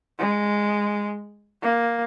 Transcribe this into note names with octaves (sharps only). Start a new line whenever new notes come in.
G#3
A#3